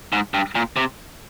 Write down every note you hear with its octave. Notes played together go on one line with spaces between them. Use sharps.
G#2
G2
A#2
C3